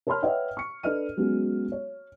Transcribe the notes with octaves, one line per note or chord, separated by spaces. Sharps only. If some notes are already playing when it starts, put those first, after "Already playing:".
A#4 C#5 A5 B5 C6 F6
B4 C#5 D#5 E5 F#5 G5
C#6 C#7
D4 A4 B4 D#5 F6 D#7
F#3 G#3 B3 C#4 F#4
C#5